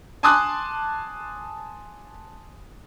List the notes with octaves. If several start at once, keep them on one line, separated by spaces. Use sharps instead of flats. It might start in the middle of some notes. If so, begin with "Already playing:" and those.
G#5 A5 C6 D6 D#6 F#6